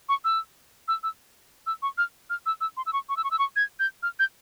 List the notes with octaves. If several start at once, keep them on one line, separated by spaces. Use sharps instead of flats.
C#6
E6
E6
E6
E6
C#6
F6
F6
E6
E6
C6
E6
C#6
C#6
E6
C#6
E6
C#6
G#6
G6
F6
G6